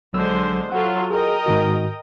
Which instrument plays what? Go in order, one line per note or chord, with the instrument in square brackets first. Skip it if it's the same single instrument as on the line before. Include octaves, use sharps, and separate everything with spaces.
[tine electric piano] A#1 F#3 E6 [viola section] D3 G#3 C5
[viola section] F#3 F4 A4 [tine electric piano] F#5
[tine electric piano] G#4 [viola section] A#4 D#5 G5
[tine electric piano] G#2 D#3 F#4